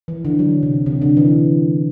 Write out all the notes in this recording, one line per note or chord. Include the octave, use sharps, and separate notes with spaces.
E3
D3
F#3
C3
C3
D3
E3